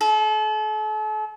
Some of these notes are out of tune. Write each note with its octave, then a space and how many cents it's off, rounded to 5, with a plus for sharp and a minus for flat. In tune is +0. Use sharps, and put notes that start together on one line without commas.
A4 -40